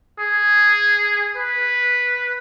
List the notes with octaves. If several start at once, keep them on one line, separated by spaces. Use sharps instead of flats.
G#4
B4